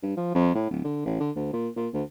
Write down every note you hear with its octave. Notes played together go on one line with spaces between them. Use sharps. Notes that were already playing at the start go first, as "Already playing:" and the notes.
G2
F3
F2
A2
D1
D3
A1
D3
D2
A#2
A#2
D2